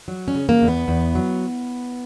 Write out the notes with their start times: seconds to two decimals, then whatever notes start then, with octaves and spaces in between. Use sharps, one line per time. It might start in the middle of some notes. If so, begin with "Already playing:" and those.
0.08 F#3
0.28 C#4
0.35 C#3
0.49 A#3
0.62 E2
0.68 B3
0.88 E2
1.15 F#3